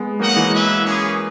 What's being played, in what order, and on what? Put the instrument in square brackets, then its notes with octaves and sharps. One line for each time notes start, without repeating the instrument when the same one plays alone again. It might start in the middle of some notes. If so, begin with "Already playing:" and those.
Already playing: [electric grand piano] G#3 B3
[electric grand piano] F#3 A#3 [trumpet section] D#4 F#4 A#4 D#5 F#5
[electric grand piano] E3 G#3
[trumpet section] E4 B4 E5
A#3 C#4 G#4